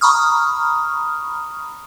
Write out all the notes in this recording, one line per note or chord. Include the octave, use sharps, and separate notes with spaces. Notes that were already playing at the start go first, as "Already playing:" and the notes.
A#5 B5 C#6 D#6 F6